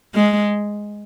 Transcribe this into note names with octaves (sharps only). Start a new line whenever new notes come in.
G#3